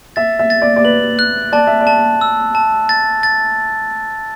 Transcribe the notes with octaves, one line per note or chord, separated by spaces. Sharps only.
E5 A6
E5
A6
D5
D5
B4 F#7
F#6
D5 A5
E5
D5
A5
E6
A5
A6
A6